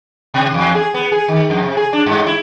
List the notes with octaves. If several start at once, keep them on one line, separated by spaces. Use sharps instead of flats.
B2
E2
G#4
B3
G#4
D#3
F2
C3
G#4
D4
G2
E4